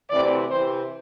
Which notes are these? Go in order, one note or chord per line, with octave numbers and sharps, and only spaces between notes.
D2 C3 E3 C4 D5
C3 E3 C4 C5